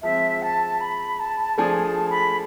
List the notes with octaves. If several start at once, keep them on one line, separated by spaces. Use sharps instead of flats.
F3 G#3 C4 E5
A5
B5
A5
F3 A3 D4 G#4 G#5
A5
B5